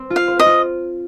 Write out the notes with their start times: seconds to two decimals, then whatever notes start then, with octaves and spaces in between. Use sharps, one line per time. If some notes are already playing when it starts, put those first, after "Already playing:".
Already playing: C4
0.10 F4
0.16 F5
0.28 C5
0.39 D#5
0.46 F4